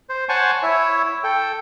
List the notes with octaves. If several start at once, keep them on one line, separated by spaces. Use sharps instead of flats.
C5
C5 C#5 F#5 G#5 A5 C#6
E4 C#5 E5
A4 G5